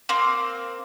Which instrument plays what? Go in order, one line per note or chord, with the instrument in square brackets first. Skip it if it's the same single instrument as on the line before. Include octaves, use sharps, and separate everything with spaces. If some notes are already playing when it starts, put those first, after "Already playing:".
[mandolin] A#3 C4